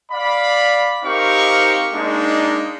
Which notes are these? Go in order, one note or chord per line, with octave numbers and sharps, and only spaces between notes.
D5 F5 B5
C4 D#4 G4 A#4 F5 C#6
G#3 A#3 D4 D#4